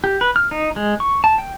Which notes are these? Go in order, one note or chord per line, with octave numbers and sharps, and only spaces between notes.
G4
B4
F6
D#4
G#3
C#6
A5
G5